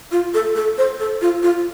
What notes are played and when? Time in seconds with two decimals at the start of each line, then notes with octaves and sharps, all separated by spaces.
0.12 F4
0.34 A4
0.56 A4
0.78 C5
1.00 A4
1.22 F4
1.43 F4